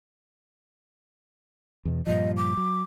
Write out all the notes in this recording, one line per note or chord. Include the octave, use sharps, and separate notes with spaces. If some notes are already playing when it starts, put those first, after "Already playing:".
E2 B2
G2 A#2 F3 D#5
D6
F#3